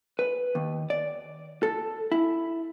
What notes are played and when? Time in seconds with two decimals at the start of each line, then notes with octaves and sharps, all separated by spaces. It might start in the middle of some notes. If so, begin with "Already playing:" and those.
0.19 B4
0.55 D#2
0.90 D5
1.63 A4
2.12 E4